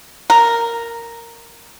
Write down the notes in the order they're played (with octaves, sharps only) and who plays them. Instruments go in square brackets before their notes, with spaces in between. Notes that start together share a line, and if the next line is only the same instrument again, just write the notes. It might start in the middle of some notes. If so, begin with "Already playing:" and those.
[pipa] A#4